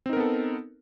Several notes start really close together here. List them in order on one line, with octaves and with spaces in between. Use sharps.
C4 D#4 A#4 B3 A4